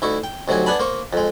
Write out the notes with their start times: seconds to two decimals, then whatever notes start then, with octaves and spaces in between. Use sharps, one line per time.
0.02 D2 D#4 E4 C#6
0.24 G5
0.48 D2 C3 F#3 D#4 G#5
0.66 B3 D4 F#5 G#5 A5 B5
0.79 A#3 C5 C#6
1.13 F2 G#3